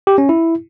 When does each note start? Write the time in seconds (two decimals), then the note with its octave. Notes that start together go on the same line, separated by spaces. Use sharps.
0.07 G4
0.18 C#4
0.29 E4